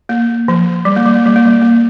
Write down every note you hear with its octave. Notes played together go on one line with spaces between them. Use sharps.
A#3
F3
G3
A#3
G3
A#3
G3
A#3
G3
A#3